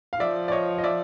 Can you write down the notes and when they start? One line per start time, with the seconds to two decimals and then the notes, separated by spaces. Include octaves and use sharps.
0.13 F5
0.20 F3 D5 E5
0.48 D5
0.52 C#5 D#5
0.78 D#5
0.84 D5 E5